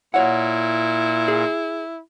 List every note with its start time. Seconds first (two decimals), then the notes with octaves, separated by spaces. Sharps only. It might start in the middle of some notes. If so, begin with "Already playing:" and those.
0.14 A#2 E4 C#5 F#5
1.28 G#4